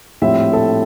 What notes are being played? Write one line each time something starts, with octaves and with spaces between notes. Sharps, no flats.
A#1 A2 G3 C4 E5
A4